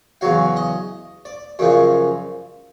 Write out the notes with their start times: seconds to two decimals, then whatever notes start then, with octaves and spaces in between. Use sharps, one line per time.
0.21 E2 C#3 F#3 F5
0.56 D#5
1.25 D5
1.59 F#2 C#3 F3 D5